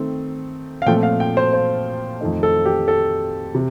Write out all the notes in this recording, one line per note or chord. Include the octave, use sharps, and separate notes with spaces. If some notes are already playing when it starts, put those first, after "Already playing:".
Already playing: D#3 A3 C4
F5
A#2 F3 A3 C4 G5
F5
G5
C5
C5
F2 D#3 A3 D#4
A4
G4
A4
C3